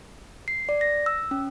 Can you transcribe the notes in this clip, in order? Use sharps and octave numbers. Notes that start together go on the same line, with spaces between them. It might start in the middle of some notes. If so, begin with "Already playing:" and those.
C7
D5
A#6
E6
C#4